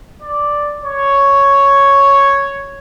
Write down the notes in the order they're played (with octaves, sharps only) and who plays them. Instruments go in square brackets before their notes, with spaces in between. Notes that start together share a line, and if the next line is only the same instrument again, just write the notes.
[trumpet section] D5
C#5